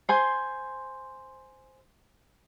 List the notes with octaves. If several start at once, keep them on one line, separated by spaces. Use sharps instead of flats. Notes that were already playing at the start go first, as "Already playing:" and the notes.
C5 G#5 C6